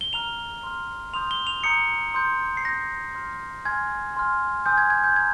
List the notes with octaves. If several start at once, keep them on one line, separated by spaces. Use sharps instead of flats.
G7
A#5 F6 F7
C6 F6
C6 D#6 G6 F7
G7
F7
A#5 D#6 G6 C#7
C6 D#6 G6
C7
C6 D#6 G6 A#6
C6 F6
G#5 C6 F6 G#6
G#5 C6 F6
G#5 C6 D#6 G6
G#6
G#6
G6
A#5 G#6